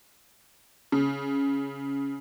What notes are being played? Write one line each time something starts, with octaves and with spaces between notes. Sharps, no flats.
C#3